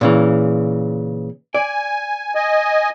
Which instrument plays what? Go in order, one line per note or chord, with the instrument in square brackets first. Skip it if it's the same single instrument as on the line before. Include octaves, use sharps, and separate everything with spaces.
[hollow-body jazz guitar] A#2 C#3 E3
[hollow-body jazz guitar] D5 [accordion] G#5
[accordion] D#5 G#5